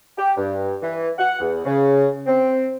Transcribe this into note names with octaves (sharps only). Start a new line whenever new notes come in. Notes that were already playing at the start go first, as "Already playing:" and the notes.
G4
G2
E3
F#5
E2
C#3
C4